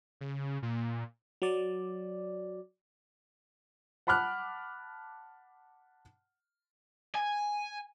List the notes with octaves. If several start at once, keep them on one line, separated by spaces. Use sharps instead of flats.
C#3
A#2
F#3 D5
F#5 A5 B5 D6 F6 F#6
G#5